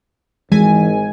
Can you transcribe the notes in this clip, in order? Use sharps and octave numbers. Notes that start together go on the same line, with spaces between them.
G#1 E3 G#3 G#5